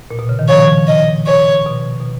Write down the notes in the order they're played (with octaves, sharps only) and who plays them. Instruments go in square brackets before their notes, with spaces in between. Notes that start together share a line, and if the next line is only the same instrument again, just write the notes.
[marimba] A#2
B2
C#3
D#3
[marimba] F3 [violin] C#5
[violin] D#5
C#5
[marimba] B2
B2